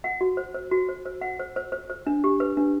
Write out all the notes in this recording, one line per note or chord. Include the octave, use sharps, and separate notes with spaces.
F#5
F#4
C5
C5
F#4
C5
C5
F#5
C5
C5
C5
C5
D4
G4
B4
D4